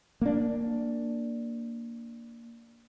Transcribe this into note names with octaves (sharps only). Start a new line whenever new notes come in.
A#3 D4